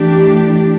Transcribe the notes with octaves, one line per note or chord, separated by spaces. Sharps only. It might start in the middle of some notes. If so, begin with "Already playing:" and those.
Already playing: E3 A3 D4 G4